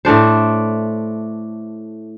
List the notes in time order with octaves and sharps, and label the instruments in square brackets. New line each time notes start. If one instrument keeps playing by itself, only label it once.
[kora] A2 A3 D4 C5